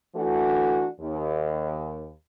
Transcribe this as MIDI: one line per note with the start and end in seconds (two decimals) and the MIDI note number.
0.15 0.85 52
0.15 0.85 57
0.15 0.85 62
0.15 0.85 66
1.00 2.10 39